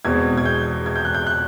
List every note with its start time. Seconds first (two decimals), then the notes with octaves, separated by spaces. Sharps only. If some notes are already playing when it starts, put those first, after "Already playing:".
0.05 E2 B2 G#3 C4 G#6
0.37 G#6
0.45 G6
0.86 G#6
0.96 G6
1.05 F#6
1.14 G6
1.27 F#6